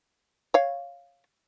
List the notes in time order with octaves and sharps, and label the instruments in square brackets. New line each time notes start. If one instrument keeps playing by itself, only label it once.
[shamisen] C#5 F5